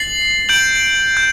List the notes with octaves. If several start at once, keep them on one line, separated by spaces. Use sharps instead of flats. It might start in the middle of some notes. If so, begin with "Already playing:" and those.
Already playing: A6 C7 F#7
G6 D7 F#7
G6